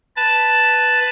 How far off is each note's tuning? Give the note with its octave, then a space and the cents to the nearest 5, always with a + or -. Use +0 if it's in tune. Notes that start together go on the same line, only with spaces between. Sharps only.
B4 +0 A5 +0